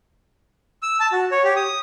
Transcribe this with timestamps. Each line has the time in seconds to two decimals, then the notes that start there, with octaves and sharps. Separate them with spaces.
0.82 E6
1.00 A5
1.12 F#4
1.31 C#5
1.44 G4
1.56 D#6